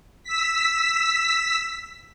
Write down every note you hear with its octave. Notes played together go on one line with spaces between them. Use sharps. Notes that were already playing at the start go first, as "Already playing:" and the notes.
E6 B6